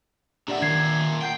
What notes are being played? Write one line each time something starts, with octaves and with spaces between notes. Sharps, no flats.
A#2 D4 G4 D5 E5 F#5
D#3 G#6 C7
F#5 G5 G6 C7